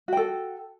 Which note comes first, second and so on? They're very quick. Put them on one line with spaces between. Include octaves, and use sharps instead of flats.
F#4 G5 A4